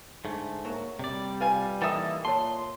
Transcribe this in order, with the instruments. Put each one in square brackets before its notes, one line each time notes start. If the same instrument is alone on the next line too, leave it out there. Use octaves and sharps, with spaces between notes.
[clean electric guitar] G#2 A3 [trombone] D3
[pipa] F#3 [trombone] A#3
[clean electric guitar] C3 D5 [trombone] G3
[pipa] F4 F5 G#5 [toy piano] B4
[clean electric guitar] E3 A#3 D#4 [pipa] A4 E5 [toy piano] G5 D#6
[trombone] A#2 [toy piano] C#5 A5 [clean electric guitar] C6